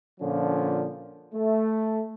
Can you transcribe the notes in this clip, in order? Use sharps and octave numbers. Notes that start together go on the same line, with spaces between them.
A#2 D3 F3 C#4
A3